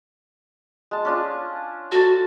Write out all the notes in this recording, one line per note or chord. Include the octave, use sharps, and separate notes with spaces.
G#3 A5
C#4 D4 F4
F#4 A4 A5